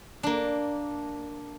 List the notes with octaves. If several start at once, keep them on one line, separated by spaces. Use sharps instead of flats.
A#3 D4